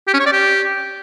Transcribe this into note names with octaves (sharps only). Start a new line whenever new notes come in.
G4
C#4
C#5
D5
G4